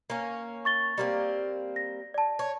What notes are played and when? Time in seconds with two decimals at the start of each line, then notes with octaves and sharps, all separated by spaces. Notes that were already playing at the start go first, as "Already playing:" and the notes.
0.10 A#3 C#4
0.65 C#6 A6 G7
0.98 G3 A#3 C4
1.76 A#6
2.14 D5 A5
2.39 C#5